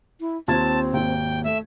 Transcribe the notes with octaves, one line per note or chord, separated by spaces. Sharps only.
E4
D#2 C4 F4 A5 G#6
G#1 D#2 G5
A3 E5